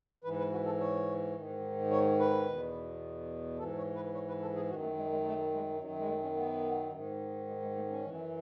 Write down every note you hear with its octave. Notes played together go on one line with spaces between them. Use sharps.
G#2 E3 B4
B4
F#4
A4
C#5
G#2 D#3
C#5
B4
E2 B2
G#2 E3 A4
C#5
B4
C#5
B4
A4
G#4
F#2 D#3 F#4
A3
G#3
G#3
A3
G#3
F#2 D#3 F#3
G#3
A3
C#4
B3
G#2 D#3
G#3
G#3
A3
C#4
F#2 E3